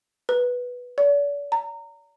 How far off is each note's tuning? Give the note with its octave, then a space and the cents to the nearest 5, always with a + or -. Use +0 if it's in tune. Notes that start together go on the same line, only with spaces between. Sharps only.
B4 -5
D5 -40
A#5 -20